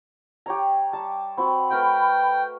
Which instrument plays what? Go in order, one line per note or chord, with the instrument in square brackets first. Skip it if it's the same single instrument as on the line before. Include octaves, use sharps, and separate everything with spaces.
[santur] G4 C#5 A#5
G3 A5
[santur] C4 F#4 [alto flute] B5
[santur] A3 A#4 B4 [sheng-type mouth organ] G5